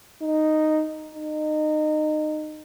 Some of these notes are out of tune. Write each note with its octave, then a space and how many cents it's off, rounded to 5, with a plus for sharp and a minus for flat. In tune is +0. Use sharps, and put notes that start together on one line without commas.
D#4 -5
D#4 -25